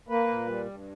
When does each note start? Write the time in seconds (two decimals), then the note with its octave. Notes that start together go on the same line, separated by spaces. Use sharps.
0.08 A#3 B4
0.28 A#2
0.47 G3
0.65 G2